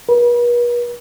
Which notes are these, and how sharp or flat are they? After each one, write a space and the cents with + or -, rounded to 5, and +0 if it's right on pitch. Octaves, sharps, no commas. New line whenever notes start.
B4 -45